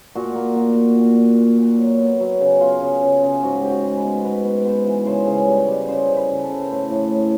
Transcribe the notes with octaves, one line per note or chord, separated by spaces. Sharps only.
A#2 F#4
A#3
A#2 F#4
A#3
A#2
A#2
A#2
A#2
F#3
B3
F#3
C#3
B3 F4
C#3
C#3
C#3
G#2 F#4
G#2 G4
F#4
G#3
B4
B3
B3 B4
B3
B3 C5
E3
C#3 C5
C#3
G3
G3
C#3 C5
C#3
B4
C#3
A4
C#3
C5
A2 B4
A2
A2